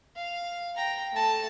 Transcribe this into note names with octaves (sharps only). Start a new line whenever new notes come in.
F5
G5 A#5
A3 A5